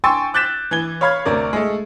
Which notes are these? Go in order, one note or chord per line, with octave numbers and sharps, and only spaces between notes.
G5 G#5 C6 C#6 E6 A6
D6 F#6 G6 A6 B6 E7
E3 G#6 G7
C#5 F5 B5 F6 G#6
D2 C3 A#4 D5
G#3 A3